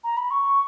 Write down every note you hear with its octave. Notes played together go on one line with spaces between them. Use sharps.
A#5
B5
C#6